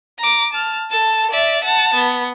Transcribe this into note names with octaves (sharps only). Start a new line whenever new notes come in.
A#5 D6
A5 F6
A4 A5
D5 E5
F#5 A5
B3